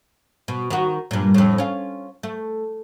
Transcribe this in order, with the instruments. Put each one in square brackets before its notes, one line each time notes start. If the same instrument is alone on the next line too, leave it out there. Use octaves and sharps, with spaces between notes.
[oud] B2
D#3 F#4
G2 A#2
F2 A2
C#4 F4
A3